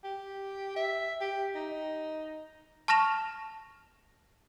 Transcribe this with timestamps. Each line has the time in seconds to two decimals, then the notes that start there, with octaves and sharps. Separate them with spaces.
0.04 G4
0.76 E5
1.21 G4
1.55 D#4
2.88 A5 C#6 F6 A#6 E7 F7